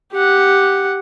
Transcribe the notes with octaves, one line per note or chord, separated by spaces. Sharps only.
G4 F#5